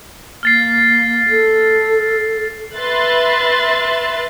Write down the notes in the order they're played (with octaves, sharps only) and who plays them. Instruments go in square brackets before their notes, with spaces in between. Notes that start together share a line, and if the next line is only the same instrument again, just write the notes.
[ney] A#3 [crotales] F6 A6 C7
[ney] A4
[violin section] B4 E5 C6 F#6 A6